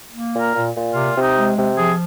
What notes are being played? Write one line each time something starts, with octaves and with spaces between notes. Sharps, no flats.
A#3
A#2
A#4
A#2
A#2
C3 F4
C3
D#4
G#3
C3
F3 G#4